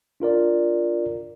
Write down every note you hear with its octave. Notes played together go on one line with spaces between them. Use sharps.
D4 F4 A#4 D5